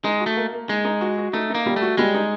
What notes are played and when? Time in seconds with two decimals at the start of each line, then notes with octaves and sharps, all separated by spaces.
0.04 G#3 D#4
0.20 F#4
0.26 A3
0.36 A#3
0.53 A#3
0.69 G#3 D#4
0.85 D#4
1.01 F#4
1.18 F#4
1.33 A3 D#4
1.50 A#3 D#4
1.66 G3
1.76 A3
1.82 F#4
1.97 G3 G#3
2.14 D#4